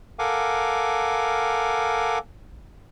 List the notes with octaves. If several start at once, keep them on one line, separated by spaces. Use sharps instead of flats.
A4 A#4 F5 F#5 G#5 D6